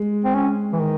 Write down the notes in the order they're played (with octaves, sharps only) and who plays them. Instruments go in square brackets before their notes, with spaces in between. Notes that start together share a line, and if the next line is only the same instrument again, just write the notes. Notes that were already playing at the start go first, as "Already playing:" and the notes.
Already playing: [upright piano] G#3
[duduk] C4
C#4
E3
D#3